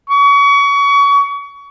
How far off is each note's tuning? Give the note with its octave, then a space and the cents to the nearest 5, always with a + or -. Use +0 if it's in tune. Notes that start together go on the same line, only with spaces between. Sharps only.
C#6 +30